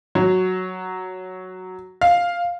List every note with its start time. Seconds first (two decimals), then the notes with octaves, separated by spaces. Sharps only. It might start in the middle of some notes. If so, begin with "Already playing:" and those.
0.15 F#3
2.01 F5